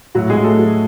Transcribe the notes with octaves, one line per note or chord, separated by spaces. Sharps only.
A2 F#3 F#4
G#3 G#4
F#3
A3 A4
F#3